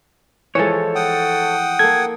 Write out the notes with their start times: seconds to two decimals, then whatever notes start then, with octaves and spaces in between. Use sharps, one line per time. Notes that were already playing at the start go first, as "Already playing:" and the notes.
0.55 E3 F3 G#3 A4 C#5
0.95 F#5 G5 D#6
1.79 A#3 A4 G#6